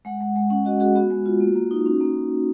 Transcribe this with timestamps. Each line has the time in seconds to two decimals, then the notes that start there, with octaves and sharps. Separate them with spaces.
0.05 G#3 F#5
0.21 G#3
0.36 G#3
0.50 C#4 F#5
0.65 F#4 D#5
0.80 F#4 G#4
0.95 B3 F#4
1.10 G#3
1.26 F4
1.40 A#3
1.56 A#3
1.71 D#4
1.86 C#4
2.00 A#3